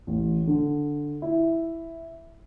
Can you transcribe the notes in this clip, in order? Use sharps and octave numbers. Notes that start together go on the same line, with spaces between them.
A1
D3
E4